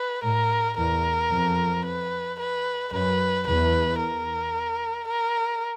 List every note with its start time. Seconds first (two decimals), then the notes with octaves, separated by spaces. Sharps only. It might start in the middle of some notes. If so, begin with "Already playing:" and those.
Already playing: B4
0.23 A2 A#4
0.77 E2 A#4
1.32 F2
1.85 B4
2.40 B4
2.93 F#2 B4
3.47 E2 B4
4.00 A#4
5.08 A#4